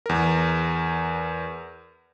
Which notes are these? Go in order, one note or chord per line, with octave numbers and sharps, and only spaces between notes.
E2 A#4